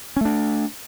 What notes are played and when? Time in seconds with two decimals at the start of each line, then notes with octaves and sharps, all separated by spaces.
0.16 C#4
0.21 A3
0.25 D4